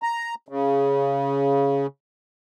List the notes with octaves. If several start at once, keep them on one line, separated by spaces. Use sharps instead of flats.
A#5
C#3